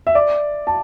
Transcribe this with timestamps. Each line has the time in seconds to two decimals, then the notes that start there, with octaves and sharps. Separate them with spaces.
0.07 E5
0.15 D5
0.67 A5